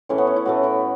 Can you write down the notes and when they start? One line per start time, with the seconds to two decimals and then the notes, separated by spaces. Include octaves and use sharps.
0.09 A2 E3 A3 C#4
0.18 B3
0.27 C#4
0.36 E4
0.45 A2 E3 A3 F#4
0.63 E4